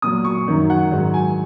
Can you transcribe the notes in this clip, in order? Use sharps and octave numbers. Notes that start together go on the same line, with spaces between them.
A#2 F#3 D#6
C#6
F#2 D#3 F#3
F#5
G#2 D#3 F#3
G#5